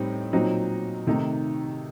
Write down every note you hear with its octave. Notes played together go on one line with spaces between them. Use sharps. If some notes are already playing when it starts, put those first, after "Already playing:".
Already playing: A2 G3 C4 D#4
A#2 F#3 C4 D#4
C3 D#3 A3 D#4